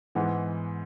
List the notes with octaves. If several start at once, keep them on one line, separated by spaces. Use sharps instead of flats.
G#2 E3 B3